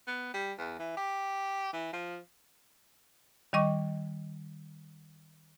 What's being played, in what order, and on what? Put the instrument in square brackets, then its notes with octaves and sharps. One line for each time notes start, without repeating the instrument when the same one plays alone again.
[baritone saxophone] B3
G3
E2
E3
G4
E3
F3
[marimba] D#3 G3 D#5 C#6 D6